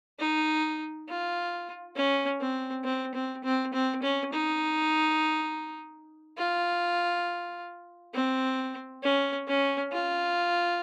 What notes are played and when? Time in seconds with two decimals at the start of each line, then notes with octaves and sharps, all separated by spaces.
0.19 D#4
1.09 F4
1.96 C#4
2.41 C4
2.84 C4
3.15 C4
3.44 C4
3.73 C4
4.03 C#4
4.33 D#4
6.38 F4
8.14 C4
9.03 C#4
9.48 C#4
9.92 F4